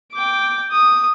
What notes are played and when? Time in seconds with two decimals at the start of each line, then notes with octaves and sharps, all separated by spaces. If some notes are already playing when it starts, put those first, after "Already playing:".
0.13 G5 D6
0.71 D#6